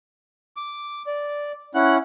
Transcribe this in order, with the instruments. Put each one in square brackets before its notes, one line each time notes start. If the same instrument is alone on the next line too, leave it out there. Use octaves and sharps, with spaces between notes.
[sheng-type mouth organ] D6
D5
C#4 E4 F#5 F#6